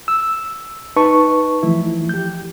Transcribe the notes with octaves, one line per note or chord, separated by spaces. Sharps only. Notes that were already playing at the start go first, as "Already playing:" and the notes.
E6
D#4 B4 A5 C#6
E3 F3 A3 E4
G4 G6